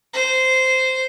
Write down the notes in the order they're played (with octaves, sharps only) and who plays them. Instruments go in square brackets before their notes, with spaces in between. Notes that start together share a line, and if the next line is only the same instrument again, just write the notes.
[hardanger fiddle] C5